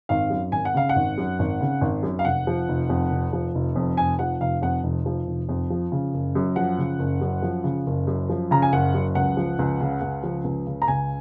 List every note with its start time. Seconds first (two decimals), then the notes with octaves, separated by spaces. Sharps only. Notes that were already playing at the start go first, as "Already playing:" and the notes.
0.09 G#1 F5
0.30 F#2
0.52 G#1 G#5
0.65 F#5
0.74 C#3 F5
0.89 F#5
0.96 G#1
1.18 F#2
1.39 G#1
1.61 C#3
1.81 G#1
2.03 F#2
2.19 F5
2.25 F1 F#5
2.47 F3
2.68 F1
2.90 F2
3.11 F1
3.33 F3
3.55 F1
3.76 F2
3.97 F1 G#5
4.19 F3 F#5
4.41 F1 F5
4.62 F2 F#5
4.83 F1
5.06 F3
5.27 F1
5.49 F2
5.70 F3
5.92 C#3
6.14 F#1
6.35 F#2
6.56 F3 F#5
6.78 C#3
6.99 F#1
7.21 F#2
7.42 F3
7.64 C#3
7.86 F#1
8.07 F#2
8.29 F3
8.51 C#3 A#5
8.62 G#5
8.72 F#1 F#5
8.94 F#2
9.15 C#2 F#5
9.37 F3
9.59 C#2
9.81 C#3
10.01 C#2
10.23 F3
10.44 C#2
10.67 C#3
10.82 A#5
10.88 C#2 G#5